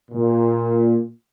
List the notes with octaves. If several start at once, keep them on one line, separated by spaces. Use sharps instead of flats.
A#2